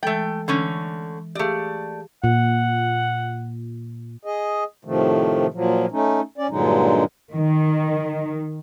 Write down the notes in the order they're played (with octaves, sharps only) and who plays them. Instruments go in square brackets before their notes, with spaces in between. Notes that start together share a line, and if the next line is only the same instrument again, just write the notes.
[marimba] E3 G#3 A4 [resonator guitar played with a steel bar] A3 G5
[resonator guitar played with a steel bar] D3 A3 C#4 [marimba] E3
[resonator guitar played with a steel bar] A3 D5 [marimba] G4 G#4 F5
[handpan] A#2 [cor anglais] F#5
[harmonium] G#4 D#5
A2 C3 D#3 F3 A3
A#2 F3 F#3
A3 C#4 D#4
C#4 D5
G2 A#2 D3 F#3 G#3 D#4
[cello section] D#3